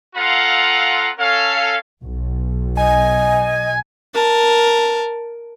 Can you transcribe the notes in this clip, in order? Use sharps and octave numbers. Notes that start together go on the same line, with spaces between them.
C4 F4 A4 F5 F#5 A#5
C#4 A4 F5
B1
D#5 G#5
A#4 A5